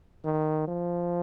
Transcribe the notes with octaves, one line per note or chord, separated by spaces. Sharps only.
D#3
F3